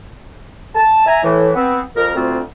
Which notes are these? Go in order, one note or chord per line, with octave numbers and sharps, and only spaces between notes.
A5
E5 G#5 A#5
A2 E3
B3 C4
F2 A#4
D2 C4 F4